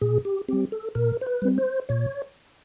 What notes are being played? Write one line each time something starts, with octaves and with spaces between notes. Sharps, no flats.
A#2 G#4
G4
G3 C4 G4
A4
A#2 A#4
C5
B4
G3 C4
C5
A#2 C#5